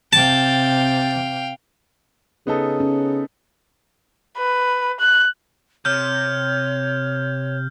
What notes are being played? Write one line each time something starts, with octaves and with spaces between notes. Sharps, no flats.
C3 F5 G5 A5
C#3 B3 D#4 A4
C#4
B4
F#6
C3 C#5 F6 G6